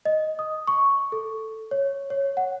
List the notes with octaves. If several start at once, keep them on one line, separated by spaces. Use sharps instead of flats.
D#5
D#6
C#6
A4
C#5
C#5
F#5